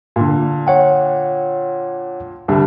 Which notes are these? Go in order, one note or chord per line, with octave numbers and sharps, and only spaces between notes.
A#2 D3
C#5 F#5 G5
C2 D3 G3